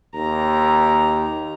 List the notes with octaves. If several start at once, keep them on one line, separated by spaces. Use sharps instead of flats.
D#2 A#5